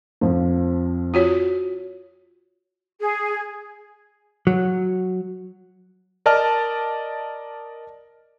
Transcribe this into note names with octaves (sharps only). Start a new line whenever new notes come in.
F2 F3
F4 F#4 C#5
G#4
F#3
A#4 D5 D#5 A5 F6